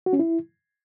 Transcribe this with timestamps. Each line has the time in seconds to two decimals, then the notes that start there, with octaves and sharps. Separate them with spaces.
0.06 F#4
0.13 C#4
0.19 E4